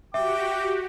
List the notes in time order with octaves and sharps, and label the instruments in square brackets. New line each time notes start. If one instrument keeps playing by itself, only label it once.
[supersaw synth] F#4 G4 [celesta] E5 [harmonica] G5 D6